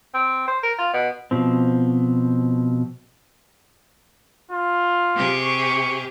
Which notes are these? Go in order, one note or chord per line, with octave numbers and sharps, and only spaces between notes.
C4
C5
A#4
F4
B2
B2 F3 C4
F4
C3 G4 G#4
C#6